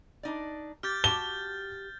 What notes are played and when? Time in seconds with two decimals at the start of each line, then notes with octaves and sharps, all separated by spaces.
0.23 D4 D#4 D5
0.83 G4 F6 G6 A6
1.04 F#4 G4 A5 G7